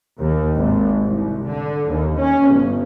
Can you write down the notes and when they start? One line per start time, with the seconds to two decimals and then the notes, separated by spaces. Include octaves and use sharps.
0.19 D#2
0.55 G#1
1.02 C2
1.48 D3
1.89 D#2
2.19 C#4
2.51 G1